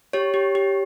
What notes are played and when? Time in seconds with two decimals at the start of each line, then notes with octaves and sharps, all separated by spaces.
0.13 G4 C#5
0.34 G4
0.55 G4